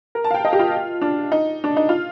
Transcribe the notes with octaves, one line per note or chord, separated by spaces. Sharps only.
A#4
A5
F5
G5
D#5
G4
F4
D4
D#4
D4
D#4
F4